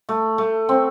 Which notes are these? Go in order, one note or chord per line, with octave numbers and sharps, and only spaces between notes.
A3
A3
C4